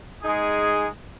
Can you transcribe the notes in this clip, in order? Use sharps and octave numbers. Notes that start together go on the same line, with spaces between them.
G#3 D#4 G#4